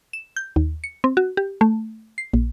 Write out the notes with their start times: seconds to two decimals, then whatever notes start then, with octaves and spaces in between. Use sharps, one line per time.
0.13 E7
0.36 G6
0.56 D#2
0.84 C#7
1.04 C4
1.17 F#4
1.37 G4
1.61 A3
2.18 C7
2.33 A#1